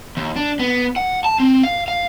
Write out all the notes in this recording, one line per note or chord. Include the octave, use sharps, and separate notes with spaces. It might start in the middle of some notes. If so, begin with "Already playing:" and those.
D#2
D4
B3
F#5
A5
C4
F5
F5